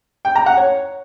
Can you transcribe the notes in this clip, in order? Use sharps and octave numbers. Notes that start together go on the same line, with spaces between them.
G5
A#5
F#5
C#5